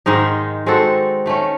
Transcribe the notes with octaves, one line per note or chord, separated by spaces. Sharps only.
G#2 D#3 G#3 D#4
G#3 C4 F#4 A4
D#3 A3 C#4